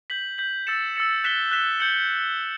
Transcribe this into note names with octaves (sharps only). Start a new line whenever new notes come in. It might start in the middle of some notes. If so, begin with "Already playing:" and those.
G6 B6 F#7
G6 B6 F#7
E6 A6 C#7 E7
E6 A6 C#7 E7
F#6 B6 E7 G7
F#6 B6 E7 G7
G6 C#7 F#7